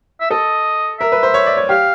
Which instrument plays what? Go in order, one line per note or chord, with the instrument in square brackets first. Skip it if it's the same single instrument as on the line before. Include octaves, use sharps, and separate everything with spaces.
[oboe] E5
[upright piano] A4 [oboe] D#5
[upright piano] A#4 [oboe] E5
[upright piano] B4
C5
C#5
D5
C#5
[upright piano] G4 [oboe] F5